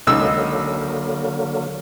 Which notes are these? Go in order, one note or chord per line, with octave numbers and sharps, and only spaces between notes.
C#2 D3 F#3 A#3 D#4 E6